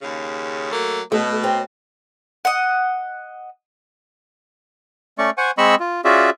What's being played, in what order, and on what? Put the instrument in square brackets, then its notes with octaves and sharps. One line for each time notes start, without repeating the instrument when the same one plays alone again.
[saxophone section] D#2 C#3
F#3 A3 A#3
[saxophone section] B2 [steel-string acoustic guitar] A3
[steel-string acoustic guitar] C4
[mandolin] D#5 F#5
[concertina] A3 C#4 D5 C#6
C5 F#5 G#5 C#6
G#3 C4 D#5 B5 C#6 E6
F4
C#4 F4 F#4 G#4 D5 E5